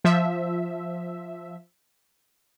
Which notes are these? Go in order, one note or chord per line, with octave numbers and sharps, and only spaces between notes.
F3 E5